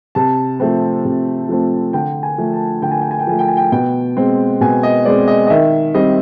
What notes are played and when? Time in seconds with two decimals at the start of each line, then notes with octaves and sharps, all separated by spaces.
0.15 C3 A5
0.60 F3 A3 C4
1.05 C3
1.49 F3 A3 C4
1.93 D3 G5
2.23 G#5
2.38 F3 A3
2.53 A5
2.82 D3 G5
2.92 G#5
3.02 G5
3.11 G#5
3.20 G5
3.27 F3 A3 G#5
3.39 G5
3.48 G#5
3.57 G5
3.72 B2 G5
4.17 G#3 C4
4.61 B2 G#5
4.83 D#5
5.05 G#3 C4 D5
5.28 D#5
5.47 D#5
5.50 D#3 E5
5.94 G3 C4 D#5